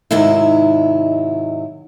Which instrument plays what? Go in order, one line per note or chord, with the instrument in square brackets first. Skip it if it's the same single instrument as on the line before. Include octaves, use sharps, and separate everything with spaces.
[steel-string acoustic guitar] G#2 C3 D#3 F#3 E4